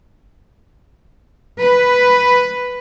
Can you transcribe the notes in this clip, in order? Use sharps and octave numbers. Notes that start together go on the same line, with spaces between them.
B4